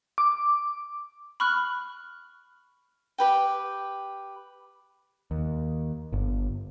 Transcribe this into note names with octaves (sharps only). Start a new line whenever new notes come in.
D6
B5 C#6 F6 F#6
G4 B4 G5
D#2
G1